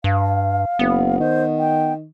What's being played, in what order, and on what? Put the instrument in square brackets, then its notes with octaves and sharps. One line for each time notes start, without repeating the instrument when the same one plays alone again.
[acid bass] G2 [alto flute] F5
[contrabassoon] F#1 [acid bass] B3
[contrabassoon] D#3 [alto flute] C5
[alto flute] G5